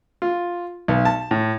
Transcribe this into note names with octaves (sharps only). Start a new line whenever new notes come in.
F4
B1
A5
A2